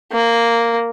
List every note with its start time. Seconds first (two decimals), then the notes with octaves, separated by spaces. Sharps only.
0.12 A#3